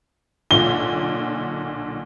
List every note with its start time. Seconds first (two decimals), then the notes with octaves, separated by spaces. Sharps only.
0.51 B1 A#2 D3 G7